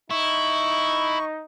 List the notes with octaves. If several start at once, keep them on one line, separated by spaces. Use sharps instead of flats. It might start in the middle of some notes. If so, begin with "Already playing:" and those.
D#4 E4 C#6